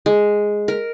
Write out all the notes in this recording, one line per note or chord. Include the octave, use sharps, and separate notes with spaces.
G#3
A#4